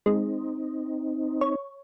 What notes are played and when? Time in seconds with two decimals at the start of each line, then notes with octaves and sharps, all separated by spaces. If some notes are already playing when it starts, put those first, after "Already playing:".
0.06 G#3 C4 D#4
1.41 C#5